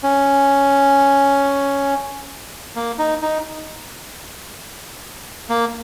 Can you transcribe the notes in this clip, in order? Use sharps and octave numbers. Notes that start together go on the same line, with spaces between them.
C#4
A#3
D#4
D#4
A#3